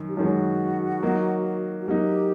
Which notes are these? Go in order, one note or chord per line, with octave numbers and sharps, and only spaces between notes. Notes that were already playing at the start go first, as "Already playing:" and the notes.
Already playing: F#2 D#3
G4
F#2 D#3 G#3 F#4
F#3 A#3 D#4
F#4
F#3 A#3 D#4 G4